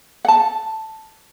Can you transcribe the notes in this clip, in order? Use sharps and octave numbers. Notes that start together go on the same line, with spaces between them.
F#5
A5